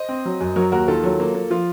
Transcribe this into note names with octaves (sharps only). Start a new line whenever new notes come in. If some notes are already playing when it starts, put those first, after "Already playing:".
Already playing: C5 D#5
C4
F#3
F#2
F#3 A#4 C#5
D#2 F#4 A#4
D#3 F4 A4
F#3
A#3
A#3
F3 F4